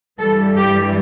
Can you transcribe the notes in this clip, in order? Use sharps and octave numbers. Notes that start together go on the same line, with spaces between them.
G2 E3 G3 A4
G4